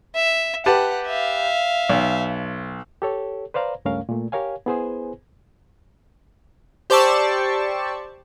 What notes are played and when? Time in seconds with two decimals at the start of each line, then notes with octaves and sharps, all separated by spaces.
0.16 E5
0.66 G4 B4 F#5 A5
1.07 E5 F5
1.90 B1
3.02 G4 A4 C#5
3.54 B4 C5 D5 F5 A#5
3.85 C#2 G2 A3 C#4 A#4 F5
4.09 A#2 A3
4.32 G4 A#4 C#5 F5 G#5
4.66 B3 E4 G#4 B4 C5 G#5
6.90 G4 C5 D5 A5 C#6 E6